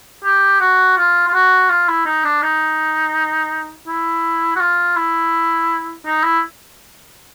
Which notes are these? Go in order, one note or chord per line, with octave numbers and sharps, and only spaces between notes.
G4
F#4
F4
F4
F#4
F4
E4
D#4
D4
D#4
E4
F#4
F4
E4
D#4
E4